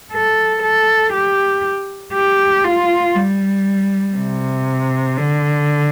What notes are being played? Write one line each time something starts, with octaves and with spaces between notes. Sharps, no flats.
A4
A4
G4
G4
F4
G3
C3
D3